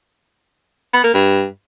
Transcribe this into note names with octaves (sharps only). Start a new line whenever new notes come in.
B3
A#3
G2